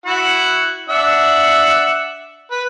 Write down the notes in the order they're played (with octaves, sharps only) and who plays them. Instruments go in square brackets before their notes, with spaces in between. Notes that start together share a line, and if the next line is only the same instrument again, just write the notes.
[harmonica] E4 F#4 F#5
D4 E5 F#5
B4